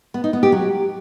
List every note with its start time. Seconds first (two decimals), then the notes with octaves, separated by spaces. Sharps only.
0.14 B3
0.24 D#4
0.33 B3
0.43 G4
0.52 F#3